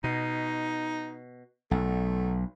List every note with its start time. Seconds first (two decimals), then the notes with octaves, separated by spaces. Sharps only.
0.04 B2 D#4
1.71 B1 A3